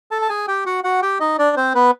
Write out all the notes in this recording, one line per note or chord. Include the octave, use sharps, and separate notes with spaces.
A4 A5
A5
G#4 G#5
G4 G5
F#4 F#5
F#4 F#5
G4 G5
D#4 D#5
D4 D5
C4 C5
B3 B4